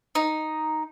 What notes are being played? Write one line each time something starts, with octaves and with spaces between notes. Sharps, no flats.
D#4